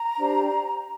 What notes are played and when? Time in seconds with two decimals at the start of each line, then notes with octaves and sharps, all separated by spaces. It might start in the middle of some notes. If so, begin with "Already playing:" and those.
Already playing: A#5
0.17 D4 G4 C5